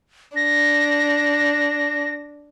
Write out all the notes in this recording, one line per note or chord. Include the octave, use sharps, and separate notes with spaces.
D4 A#6